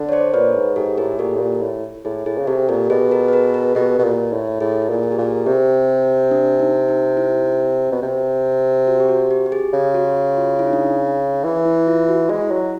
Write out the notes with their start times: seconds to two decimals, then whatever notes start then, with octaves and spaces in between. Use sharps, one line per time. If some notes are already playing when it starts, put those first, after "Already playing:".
Already playing: D3
0.09 C#5
0.12 C5 D5
0.34 A#2 B4 C#5
0.55 G#2
0.76 G#2 G4 A4
0.98 A2 G#4 A#4
1.19 A#2 G4 A4
1.35 A2
1.41 A#2
1.62 A2
2.05 A2 G#4
2.26 A2 G#4
2.38 C#3
2.47 C3 G4 A4
2.69 A#2 G4 A4
2.90 B2 G#4
3.11 G#4 A#4
3.28 B4
3.33 G#4 A#4
3.54 G#4 A#4
3.75 B2 G4 A4
3.99 B2
4.04 A#2
4.32 A2
4.60 A2 G#4
4.72 A4
4.82 G#4
4.90 A#2
5.03 G#4
5.12 G4
5.18 A#2 G#4
5.46 C3 G4
6.31 D4
6.60 D#4
6.89 D#4
7.17 E4
7.92 B2
8.02 C3
8.87 F#4
9.00 G4
9.09 F#4
9.31 G4
9.46 G4
9.52 G#4
9.73 C#3
9.94 F#4
10.16 F#4
10.37 F4
10.59 E4
10.66 D#4
10.73 D4
10.81 D#4
11.44 E3
11.65 E4
11.87 F4
12.09 F#4
12.29 G#3 E4
12.51 F#3